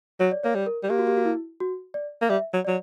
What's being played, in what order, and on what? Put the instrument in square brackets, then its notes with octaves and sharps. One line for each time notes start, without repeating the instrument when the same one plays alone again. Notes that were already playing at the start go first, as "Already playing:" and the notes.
[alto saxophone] F#3 [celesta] C#5
[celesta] D5
[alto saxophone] A#3 [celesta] C#5
[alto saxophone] G3
[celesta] A#4
[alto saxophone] G3
[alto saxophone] A#3 [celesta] G4
[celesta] F#4
G4
F#4
E4
F#4
D5
[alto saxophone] A#3
[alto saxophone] G3 [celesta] E5
[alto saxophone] F#3
[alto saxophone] F#3 [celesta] D5